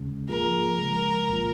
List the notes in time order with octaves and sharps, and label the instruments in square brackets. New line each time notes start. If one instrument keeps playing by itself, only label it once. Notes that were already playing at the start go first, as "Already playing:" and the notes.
Already playing: [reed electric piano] D#2 C#3 G#3 C#4
[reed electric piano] G#2 F3 A#3 F4 G#4 [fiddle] A#4
[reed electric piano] C#3 F3 G#3
C2 A#2 F3 A#3 F4